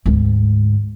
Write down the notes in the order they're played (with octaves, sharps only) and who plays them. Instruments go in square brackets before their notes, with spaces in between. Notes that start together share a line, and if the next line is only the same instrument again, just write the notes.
[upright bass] D2 G#2